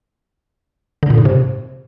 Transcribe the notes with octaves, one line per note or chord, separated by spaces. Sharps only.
D3
A#2
G#2
C3